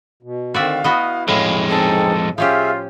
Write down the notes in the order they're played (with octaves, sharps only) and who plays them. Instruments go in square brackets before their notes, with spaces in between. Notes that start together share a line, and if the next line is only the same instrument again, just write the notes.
[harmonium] B2
[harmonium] D3 D#3 C4 [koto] F#4 D5 E5 [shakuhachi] F5
[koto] B3 F#4 D#5 [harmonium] E4
[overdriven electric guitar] F2 G#3 [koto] A2 [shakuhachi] F5
[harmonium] C4 D#4 G#4 [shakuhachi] A4
[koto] F3 C#4 G4 [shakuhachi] F4 [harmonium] G#4 E5 F5